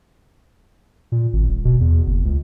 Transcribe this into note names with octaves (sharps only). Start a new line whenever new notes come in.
A#2
G#1
D#1
B2
E2
F#1
C#2